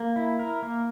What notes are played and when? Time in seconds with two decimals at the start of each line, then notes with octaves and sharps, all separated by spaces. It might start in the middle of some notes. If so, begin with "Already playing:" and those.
Already playing: A#3
0.16 E4
0.39 A#4
0.63 A#3